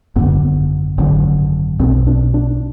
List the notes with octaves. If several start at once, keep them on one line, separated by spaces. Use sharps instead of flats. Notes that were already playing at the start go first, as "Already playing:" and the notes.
G#1 F#2 D3 B3
G#1 F#2 D3
B1 B2 C4
D4
D4